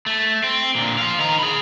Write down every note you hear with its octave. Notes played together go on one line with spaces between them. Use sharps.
A3
C4
A#2 D3
C5 F5
D#3 A#5
G#4 B5